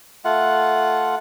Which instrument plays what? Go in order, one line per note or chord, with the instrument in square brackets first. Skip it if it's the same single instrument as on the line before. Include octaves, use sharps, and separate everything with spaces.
[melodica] A3 F4 F#5